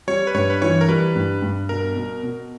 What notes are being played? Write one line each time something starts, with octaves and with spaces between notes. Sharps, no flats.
G3 C#5
B4
G2 C#5
B4
E3 C#5
A#4
G3 B4
G2
G2
B2 A#4
B2
B2